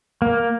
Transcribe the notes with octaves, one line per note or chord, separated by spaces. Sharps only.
A#3